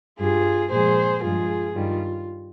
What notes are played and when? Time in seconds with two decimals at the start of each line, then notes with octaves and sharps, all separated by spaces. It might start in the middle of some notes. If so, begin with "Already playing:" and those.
0.20 G2 G3 F4 G#4
0.72 A#2 F3 G#3 G#4 C5
1.23 G2 F3 G#3 F4 G#4
1.75 G2 D#3 G3 F4